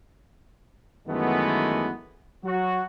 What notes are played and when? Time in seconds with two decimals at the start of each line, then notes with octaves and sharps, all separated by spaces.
1.07 F#2 D#3 E3 G#3 A3 B3
2.44 F#3 F#4